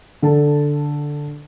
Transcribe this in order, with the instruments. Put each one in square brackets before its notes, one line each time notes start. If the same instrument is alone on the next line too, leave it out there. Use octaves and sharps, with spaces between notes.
[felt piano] D3 A4 A5